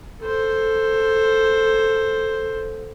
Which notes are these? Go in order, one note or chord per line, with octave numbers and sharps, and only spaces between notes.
A4 C5